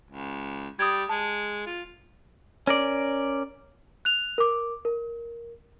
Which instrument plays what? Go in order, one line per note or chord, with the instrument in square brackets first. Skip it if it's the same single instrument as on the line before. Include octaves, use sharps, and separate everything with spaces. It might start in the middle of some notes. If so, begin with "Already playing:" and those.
[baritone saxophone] C#2
[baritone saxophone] G3 [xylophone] D#6 G#6
[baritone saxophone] G#3 [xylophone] A5
[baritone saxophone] F4
[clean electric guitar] C#4 A#4 D5
[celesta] F#6 F7
A#4 D6
A#4